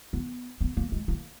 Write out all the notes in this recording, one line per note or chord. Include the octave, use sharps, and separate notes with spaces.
B3
B3
A#3
G#3
A#3